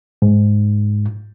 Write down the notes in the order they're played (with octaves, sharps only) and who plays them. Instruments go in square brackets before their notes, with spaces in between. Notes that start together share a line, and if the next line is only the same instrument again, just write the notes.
[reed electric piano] G#2